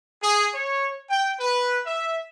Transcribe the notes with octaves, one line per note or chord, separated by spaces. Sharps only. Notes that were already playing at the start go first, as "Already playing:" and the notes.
G#4
C#5
G5
B4
E5